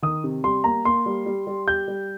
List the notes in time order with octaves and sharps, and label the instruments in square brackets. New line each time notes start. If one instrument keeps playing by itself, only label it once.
[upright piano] D#3 [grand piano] D#6
[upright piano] C3
[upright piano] G3 [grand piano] C6
[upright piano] A#3 [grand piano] A#5
[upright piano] A#3 [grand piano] C6
[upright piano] G3
G3
G3
[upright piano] G4 [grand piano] G6
[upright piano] G3